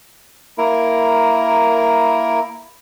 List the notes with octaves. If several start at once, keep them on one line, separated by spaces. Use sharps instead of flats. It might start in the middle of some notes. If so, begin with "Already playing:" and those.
A#3 E4 A#4